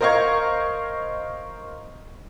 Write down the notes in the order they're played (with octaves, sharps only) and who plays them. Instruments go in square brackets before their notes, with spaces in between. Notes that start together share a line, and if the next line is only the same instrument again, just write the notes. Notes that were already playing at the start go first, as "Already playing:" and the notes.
[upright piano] A#4 C5 D#5 F5 C#6 G#6